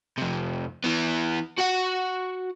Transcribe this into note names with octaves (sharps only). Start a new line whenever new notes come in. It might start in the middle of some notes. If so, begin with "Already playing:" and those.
F2 C3
E3 B3
F#4 F#5